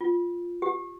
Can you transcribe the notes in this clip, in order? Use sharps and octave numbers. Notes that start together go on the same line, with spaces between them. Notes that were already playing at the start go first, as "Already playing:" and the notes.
F4
G4